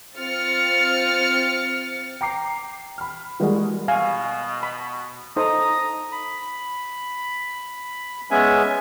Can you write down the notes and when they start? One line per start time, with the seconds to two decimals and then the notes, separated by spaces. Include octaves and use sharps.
0.17 C4 F4 F6 A6 C#7
2.21 G5 A#5 D6 C7
2.98 B5 F6
3.40 E3 G3 G#3 A#3 F#4 G#4
3.88 B2 F5 G#5
4.63 B5
5.36 D#4 A4 C5 A#5 D#6
6.12 B5
8.31 G#3 B3 C#4 E5 G#5